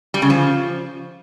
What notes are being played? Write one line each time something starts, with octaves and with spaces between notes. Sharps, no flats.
G3
C#3
F3